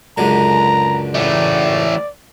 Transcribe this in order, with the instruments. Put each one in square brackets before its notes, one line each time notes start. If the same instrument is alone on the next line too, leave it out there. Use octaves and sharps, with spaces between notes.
[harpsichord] C#2 F#2 D3 [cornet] A#5
[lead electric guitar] E3 A3 [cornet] D5